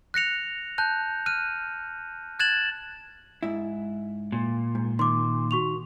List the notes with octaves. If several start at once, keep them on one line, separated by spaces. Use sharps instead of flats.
F#6 A#6 C#7 F7
A5 F#6 G6
F6 F#6 D#7
F#6 G#6 A6 E7 F#7
G#2 E4
A#2
G#2
D#3 C6 D6
F#4 C#6 F7